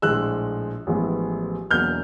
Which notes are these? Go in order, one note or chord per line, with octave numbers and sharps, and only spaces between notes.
A#1 A2 F3 G#3 E6 F#6
A1 A2 F3 G#3 B3
E1 E2 B2 F#3 A#3 F6 G6